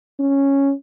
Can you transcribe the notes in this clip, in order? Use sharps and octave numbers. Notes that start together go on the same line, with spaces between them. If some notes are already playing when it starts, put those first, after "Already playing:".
C#4